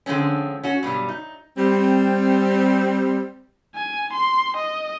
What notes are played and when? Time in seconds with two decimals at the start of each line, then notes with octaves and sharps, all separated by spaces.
0.06 D3 F3 G#3 C4 C#4
0.63 C#4 F#4
0.83 G2 B2 F#3 G3
1.09 D#4
1.57 G3 C4
3.75 G#5
4.13 C6
4.57 D#5